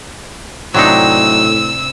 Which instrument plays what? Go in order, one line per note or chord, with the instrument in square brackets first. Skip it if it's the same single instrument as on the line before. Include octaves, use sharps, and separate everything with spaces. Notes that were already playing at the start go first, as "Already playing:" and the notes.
[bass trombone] A2 [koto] C3 D4 [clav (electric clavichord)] F#3 D#4 [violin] E6